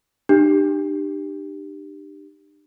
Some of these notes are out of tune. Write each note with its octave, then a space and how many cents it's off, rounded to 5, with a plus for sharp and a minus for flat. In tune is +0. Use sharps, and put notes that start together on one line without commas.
D4 +45 G4 +0